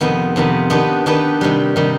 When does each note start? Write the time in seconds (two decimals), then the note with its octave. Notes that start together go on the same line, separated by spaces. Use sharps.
0.01 F2 C3 D#3 B3
0.36 F2 C3 D#3 B3
0.70 D#3 B3 D4 G4 B4
1.06 D#3 B3 D4 G4 B4
1.41 C3 D#3 G3
1.76 C3 D#3 G3